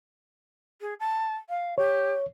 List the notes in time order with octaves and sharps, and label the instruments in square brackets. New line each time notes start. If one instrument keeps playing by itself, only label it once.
[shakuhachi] G#4
A5
F5
[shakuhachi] G4 [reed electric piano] C#5